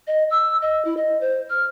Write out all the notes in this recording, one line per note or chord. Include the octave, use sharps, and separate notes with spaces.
D#5
E6
D#5
E4
D#5
C5
F6